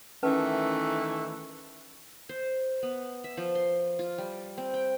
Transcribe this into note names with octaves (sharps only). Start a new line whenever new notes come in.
D#3 E3 A3 C#4 B4 A5
C5
B3
E5
F3
C6
F4
G3
C4
G5